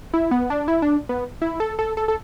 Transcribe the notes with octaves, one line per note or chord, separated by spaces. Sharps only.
E4
B3
D4
E4
D4
B3
E4
A4
A4
A4
A4